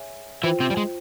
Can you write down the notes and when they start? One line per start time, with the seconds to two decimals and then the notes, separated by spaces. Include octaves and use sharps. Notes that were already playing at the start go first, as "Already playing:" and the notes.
Already playing: G#4 C#5 E5 G#5
0.43 E3 E4 F4 C5 G5
0.60 C3 C4
0.70 G3
0.77 G#3